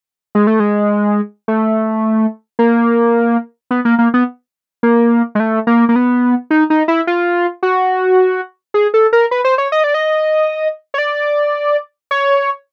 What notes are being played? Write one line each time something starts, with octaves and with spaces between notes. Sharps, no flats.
G#3
A3
G#3
A3
A#3
B3
A#3
A#3
B3
A#3
G#3
A3
A#3
A#3
B3
D#4
D#4
E4
F4
F#4
G#4
A4
A#4
B4
C5
C#5
D#5
D5
D#5
C#5
D5
C#5